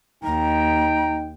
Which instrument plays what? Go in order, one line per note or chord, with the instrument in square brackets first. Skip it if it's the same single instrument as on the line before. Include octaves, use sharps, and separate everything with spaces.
[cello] D#2 [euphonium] D#4 [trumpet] G5 [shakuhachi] A#5